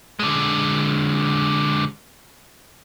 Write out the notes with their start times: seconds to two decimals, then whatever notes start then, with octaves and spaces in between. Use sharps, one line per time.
0.19 D3 G#3